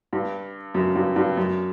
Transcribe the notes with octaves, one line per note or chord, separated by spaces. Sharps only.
G2
F#2
G2
G2
F#2